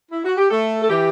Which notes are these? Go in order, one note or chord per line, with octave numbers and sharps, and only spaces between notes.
E4
F#4
G4
A3 A4
A4
E3 G4